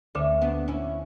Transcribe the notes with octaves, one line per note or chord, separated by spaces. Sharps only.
D2 D3 A3 C#4
B3 D4
C#4 E4